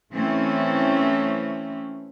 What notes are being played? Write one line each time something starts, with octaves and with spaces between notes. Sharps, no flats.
E3 A3 C4 C#4